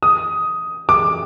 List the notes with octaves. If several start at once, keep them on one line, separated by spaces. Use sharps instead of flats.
D#6
D6